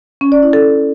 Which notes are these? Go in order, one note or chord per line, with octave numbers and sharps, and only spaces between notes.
C#4
D5
E4
A4